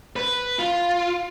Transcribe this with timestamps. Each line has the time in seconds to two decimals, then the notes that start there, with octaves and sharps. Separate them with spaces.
0.16 B4
0.59 F4